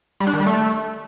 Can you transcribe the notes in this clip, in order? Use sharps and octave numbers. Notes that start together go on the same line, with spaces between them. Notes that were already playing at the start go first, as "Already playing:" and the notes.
G3
D4
D#3
G3
A3